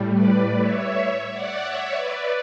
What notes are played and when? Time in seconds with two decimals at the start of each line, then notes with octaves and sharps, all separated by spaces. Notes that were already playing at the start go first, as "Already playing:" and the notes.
Already playing: A2 G3
0.12 B4 D5
0.57 C#5 E5
1.32 D5 F#5
1.61 C#5 E5
1.91 B4 D5